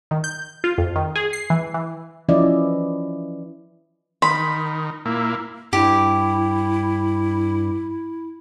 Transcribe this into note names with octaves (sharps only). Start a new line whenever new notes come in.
D#3
G6
F4
F2
D#3
G#4
C7
E3
E3
E3 F3 C#4 E4 D5 D#5
D#3 B5 C6
A#2 A#3 E4
G2 E4 G4